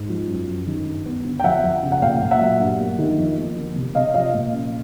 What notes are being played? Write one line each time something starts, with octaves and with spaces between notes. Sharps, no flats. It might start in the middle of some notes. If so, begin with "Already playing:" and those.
Already playing: G#2
F3
F#2
F#2
D#3
G2
B3
D3
G5
F2 E5 F#5
F2
C#3
F#5
A#2 F5 G5
A#2
E5 F#5
F#3
G2
A#3
D#3
F2
A#3
D3
C3
C3 D#5 F5
F3 D#5 F5
A#2
C#4